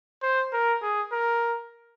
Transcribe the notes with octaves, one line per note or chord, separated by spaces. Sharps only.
C5
A#4
G#4
A#4